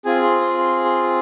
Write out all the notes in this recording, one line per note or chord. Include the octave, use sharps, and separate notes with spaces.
C4 F4 G#4 G#5
C6
C6
C6
C6